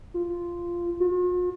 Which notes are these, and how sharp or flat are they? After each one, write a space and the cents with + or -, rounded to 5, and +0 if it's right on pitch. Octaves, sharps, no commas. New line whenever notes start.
F4 -10
F4 +45